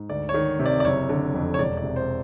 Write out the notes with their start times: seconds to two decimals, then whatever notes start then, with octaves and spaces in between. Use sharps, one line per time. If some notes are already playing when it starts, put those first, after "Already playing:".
Already playing: G#2
0.10 D2 D5
0.29 C#5
0.34 D#3
0.59 C3
0.66 D5
0.80 D5
0.84 F#1 C#5
1.09 D3
1.34 F2
1.54 C#5
1.59 E1 D5
1.77 D5
1.83 C3
1.96 C5